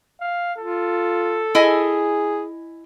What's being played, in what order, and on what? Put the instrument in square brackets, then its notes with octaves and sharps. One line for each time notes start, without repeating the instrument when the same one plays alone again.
[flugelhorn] F5
[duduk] F4 [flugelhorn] A4
[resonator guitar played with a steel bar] E4 D#5 G#5 [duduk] G#4